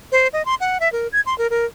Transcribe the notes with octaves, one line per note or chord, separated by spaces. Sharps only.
C5
D#5
C6
F#5
E5
A#4
G#6
C6
A#4
A#4